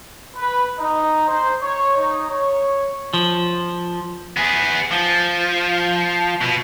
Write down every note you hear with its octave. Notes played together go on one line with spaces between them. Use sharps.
B4
D#4
C5
C#5
D#4
C#5
F3
B3 G#4
F3
B2